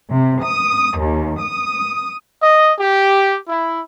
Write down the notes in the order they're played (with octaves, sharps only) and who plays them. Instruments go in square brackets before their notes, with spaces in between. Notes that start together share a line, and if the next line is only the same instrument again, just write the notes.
[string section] C3
D#6
D#2
D#6
[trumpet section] D#5
G4
E4